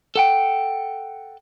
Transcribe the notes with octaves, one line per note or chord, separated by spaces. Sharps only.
A4 F#5 G5